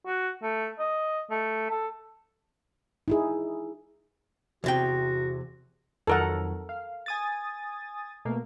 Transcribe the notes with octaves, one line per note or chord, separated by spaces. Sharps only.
F#4
A3
D#5
A3
A4
D#4 E4 G#4
E2 C3 F#4 G5
F2 D#3 F#3 A4 A#4 F#5
F5
G#5 D#6 A6
B2 A3 A#3